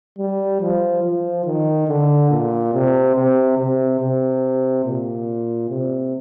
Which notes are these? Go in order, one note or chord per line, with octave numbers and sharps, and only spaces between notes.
G3
F3
F3
D#3
D3
A#2
C3
C3
C3
C3
A#2
C3